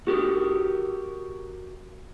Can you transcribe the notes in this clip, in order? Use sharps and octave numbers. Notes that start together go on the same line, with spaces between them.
F#4 G4 A#4